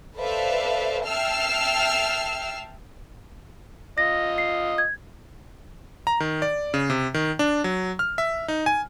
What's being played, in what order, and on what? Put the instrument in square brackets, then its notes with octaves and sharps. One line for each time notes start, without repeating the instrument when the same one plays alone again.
[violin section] A4 B4 C5 D5 E5 F5
E5 G5 A5 E6 F6 C7
[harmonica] F4 D#5 [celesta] A#6
[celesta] C7
G#6
[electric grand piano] A#5
D#3
D5
C#3
C3
D#3
D4
F#3
F6
E5
D#4
G#5